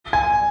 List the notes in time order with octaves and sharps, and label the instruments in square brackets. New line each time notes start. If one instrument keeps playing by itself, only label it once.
[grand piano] G#5